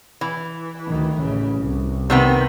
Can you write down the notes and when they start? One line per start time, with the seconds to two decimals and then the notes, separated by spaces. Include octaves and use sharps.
0.21 E3
0.88 D2 D#3
1.22 A1 C#3
1.62 C2
2.10 C3 D#3 B3